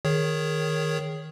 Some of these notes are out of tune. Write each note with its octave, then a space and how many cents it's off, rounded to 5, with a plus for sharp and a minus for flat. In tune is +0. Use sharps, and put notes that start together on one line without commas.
D#3 +0 G#4 +0 C#5 +0